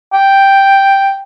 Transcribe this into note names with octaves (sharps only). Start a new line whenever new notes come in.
G5